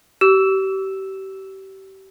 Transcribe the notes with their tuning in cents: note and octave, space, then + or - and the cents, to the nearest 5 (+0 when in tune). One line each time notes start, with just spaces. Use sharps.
G4 -35 E6 +0